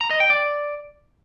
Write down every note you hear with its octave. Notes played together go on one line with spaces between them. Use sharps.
A#5
D#5
G5
D5